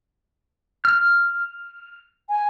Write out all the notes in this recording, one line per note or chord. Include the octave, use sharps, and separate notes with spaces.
F6
G#5